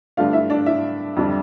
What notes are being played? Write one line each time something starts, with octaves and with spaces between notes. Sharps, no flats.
G2 D3 A3 D4 F4 F5
E4 E5
D4 D5
E4 E5
F2 D3 G3 D4